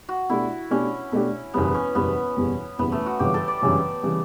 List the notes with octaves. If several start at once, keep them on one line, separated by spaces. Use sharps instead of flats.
F#4
B2 A3 D4 E4 G4
B2 A3 C#4 D4 G4
B2 A3 D4 G4
F#1 E2 B2 G3 B3
C#4
F#1 E2 B2 G3 B3
F#1 E2 B2 G3
F#1 E2 B2 G3 B3
A3
F#4
G1 F#2 C#3 E3 G3 G4
A4
D5
G1 F#2 C#3 E3 G3
C#3 E3 G3